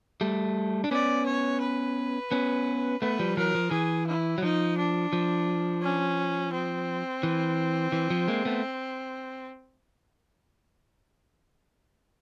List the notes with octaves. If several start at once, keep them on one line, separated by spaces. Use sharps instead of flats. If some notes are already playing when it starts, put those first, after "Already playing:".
G3 A3
D4
B3 C#4 D5
C#5
B4
B3 C#4
A3 B3 B4
F3 G3
E3 F#3 A#4
F3
E3 G#4
E4
F#3
F3 D#4
D4
F3
C#4
C4
E3
E3
F3
G#3 A#3
A3 B3